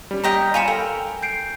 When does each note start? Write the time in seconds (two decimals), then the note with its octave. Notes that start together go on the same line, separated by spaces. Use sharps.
0.11 G3 C#4
0.24 C#5 D#5 G5 A#5 B6
0.54 F4 C#5 G#5 B5 C#7 E7
0.68 A4 A#4 G5
1.22 G6 C7 D7